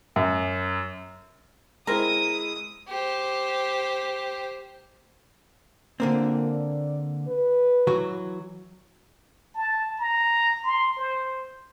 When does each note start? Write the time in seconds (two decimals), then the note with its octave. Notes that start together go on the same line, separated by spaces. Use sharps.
0.16 F#2
1.87 G#3 C4 E4 A#4 D#6
2.88 G4 C5
6.00 A#2 D3 A#3 C4
6.50 D5
7.28 B4
7.87 E3 F#3 F#4
9.54 A5
9.99 A#5
10.64 C6
10.97 C5